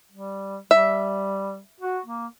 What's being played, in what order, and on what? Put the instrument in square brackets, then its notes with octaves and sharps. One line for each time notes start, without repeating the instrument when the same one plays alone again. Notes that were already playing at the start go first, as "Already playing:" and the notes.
[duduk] G3
[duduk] G3 [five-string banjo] E5
[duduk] F#4
A#3